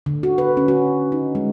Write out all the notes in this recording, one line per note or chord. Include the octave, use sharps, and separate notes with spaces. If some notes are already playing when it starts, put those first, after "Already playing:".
D3
F#4
B4
C#4
F#4
D#4
G#3